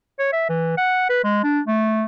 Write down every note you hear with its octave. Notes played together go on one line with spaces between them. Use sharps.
C#5
E5
E3
F#5
B4
G#3
D4
A3